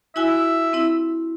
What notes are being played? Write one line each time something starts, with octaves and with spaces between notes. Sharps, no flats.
E4 F#4 E5 G#5
C4 E4